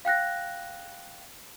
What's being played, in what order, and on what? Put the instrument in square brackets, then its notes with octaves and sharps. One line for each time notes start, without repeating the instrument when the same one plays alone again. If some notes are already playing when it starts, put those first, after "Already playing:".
[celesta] F5 G5 F#6 A#6